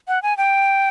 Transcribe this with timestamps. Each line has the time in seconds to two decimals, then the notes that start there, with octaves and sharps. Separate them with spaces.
0.08 F#5
0.23 G#5
0.37 G5